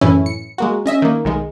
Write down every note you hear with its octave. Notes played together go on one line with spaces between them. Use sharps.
F#2 A2 E3 C#4 E4
C#7
G#3 A#3 F#4
C#4 D#5 E5
D#3 A#3
B1 D#3 G#3